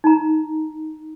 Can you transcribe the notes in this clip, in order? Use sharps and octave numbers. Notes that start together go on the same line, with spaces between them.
D#4 A#5